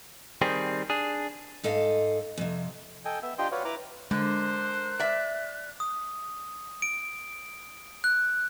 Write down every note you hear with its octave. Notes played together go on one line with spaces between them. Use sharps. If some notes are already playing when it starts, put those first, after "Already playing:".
D#3 G3 C4 G#4
D4 G#4
G#2 A4 D#5 F5
F2 C3
A4 D#5 G5 G#5
B3 E5
D4 F4 G4 D#5 G5 C6
F#4 B4 C#5 D5 F5
E4 B4 A#5 D6
D3 G#3 A#4 C5 F#6
D5 E5
D#6
D7
F#6